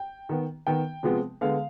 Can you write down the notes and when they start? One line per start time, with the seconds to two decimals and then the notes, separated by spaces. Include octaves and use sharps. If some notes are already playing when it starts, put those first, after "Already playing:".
Already playing: G5
0.29 D#3 B3
0.67 D#3 B3 G5
1.03 C3 F3 G#3 B3
1.41 D3 G#3 B3 F5